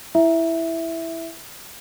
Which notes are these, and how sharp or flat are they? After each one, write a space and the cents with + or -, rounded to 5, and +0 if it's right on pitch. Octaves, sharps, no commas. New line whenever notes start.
E4 +0 E5 +0